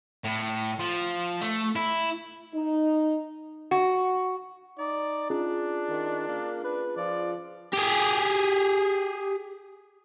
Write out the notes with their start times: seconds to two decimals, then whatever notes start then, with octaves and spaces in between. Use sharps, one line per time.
0.24 A2
0.79 F3
1.41 A3
1.76 E4
2.54 D#4
3.71 F#4
4.79 D#4 D5
5.30 C#4 D4 F4 G#4
5.90 D#3
6.28 A#3
6.64 D4 B4
6.97 F3 D5
7.73 G4 G#4